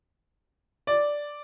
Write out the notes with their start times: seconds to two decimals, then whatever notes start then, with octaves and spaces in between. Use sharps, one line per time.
0.87 D5